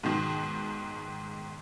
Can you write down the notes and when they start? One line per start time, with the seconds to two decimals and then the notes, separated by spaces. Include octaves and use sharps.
0.03 G#2 B2 D#3